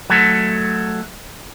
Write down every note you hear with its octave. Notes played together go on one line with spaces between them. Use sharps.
F#3 A3